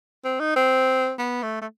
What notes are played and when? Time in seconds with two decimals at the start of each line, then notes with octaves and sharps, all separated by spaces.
0.25 C4
0.40 D#4
0.56 C4
1.19 B3
1.43 A3
1.62 A3